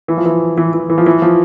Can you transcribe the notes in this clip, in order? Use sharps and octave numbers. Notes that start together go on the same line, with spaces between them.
E3
F3
E3
E3
E3
E3
F3
E3
F3